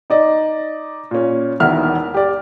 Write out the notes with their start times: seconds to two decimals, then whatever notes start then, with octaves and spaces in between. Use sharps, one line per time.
0.10 D#4 D5 D#5
1.11 A#2 C#4
1.60 E1 E2 D#3 E5 F6
2.14 G4 D5